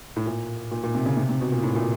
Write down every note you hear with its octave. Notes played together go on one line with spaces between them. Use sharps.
A2
A#2
A#2
A#2
C3
C#3
C3
C3
B2
A#2
A2
A#2